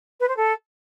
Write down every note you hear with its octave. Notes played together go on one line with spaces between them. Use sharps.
B4
C5
A4